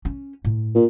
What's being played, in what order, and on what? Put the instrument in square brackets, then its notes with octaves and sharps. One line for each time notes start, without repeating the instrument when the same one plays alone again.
[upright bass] C#4
A2
[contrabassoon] A#2